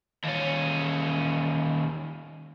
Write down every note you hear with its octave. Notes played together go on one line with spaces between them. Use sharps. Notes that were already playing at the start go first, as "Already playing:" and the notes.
D#2 C#4